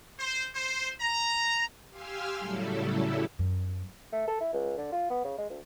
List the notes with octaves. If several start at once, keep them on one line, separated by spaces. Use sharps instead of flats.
C5
C5
A#5
G4 F5 G#5 C6 E6 F6
A2 C#3 F#3 G3 E4 A4
F#2
A3
A4
E4
C#2
D3
F4
B3
C#3
G#3
D2